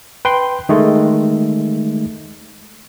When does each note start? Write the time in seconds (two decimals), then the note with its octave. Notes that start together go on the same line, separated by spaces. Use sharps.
0.25 B4 G5 C6
0.69 D#3 G#3 A3